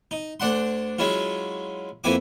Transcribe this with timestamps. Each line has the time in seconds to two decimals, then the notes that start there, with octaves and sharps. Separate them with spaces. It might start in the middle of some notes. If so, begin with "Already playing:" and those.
0.11 D#4
0.40 D2 D4 F#5 C6
0.98 F#3 G#3 C#4 E4 F4
2.04 F2 A#3 B3 E4 G#5 D6